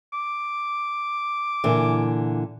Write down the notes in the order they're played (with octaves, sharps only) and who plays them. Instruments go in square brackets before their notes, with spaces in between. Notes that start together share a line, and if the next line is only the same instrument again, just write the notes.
[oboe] D6
[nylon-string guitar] A#2 D3 E3